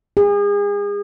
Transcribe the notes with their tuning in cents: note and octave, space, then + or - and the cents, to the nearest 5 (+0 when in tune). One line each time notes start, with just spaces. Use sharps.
G#4 -35